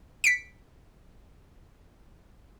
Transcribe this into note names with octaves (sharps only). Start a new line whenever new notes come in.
B6 C#7 D7